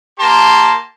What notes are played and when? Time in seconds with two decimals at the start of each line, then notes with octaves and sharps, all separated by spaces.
0.19 A#3 G4 A5 A#5 C6